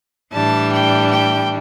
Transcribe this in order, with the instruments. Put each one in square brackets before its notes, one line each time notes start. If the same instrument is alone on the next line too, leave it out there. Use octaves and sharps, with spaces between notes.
[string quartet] A2 E3 G3 D4 A5
G5
G5